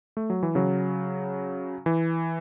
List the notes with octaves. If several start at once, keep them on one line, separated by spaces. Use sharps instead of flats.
A3
F#3
E3
C#3 F#3
E3